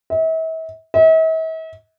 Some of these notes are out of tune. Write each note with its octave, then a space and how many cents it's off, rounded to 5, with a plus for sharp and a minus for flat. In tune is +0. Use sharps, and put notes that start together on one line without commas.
E5 -40
E5 -45